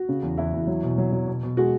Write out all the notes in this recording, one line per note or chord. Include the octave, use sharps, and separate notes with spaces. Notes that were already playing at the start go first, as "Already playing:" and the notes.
Already playing: F#4
C#3
E2
E2 E4
E2
F#3
B2
F#3
F#3
B2
B2
G#3 F#4